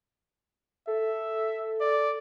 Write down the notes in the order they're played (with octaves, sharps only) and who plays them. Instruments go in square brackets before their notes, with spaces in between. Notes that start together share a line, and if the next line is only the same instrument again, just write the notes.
[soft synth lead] A4 [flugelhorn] E5
[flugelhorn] D5